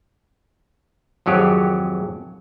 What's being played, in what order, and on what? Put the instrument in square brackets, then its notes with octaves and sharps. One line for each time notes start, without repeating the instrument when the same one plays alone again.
[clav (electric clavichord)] G#1 F2 F#3 G4 G#4 C#5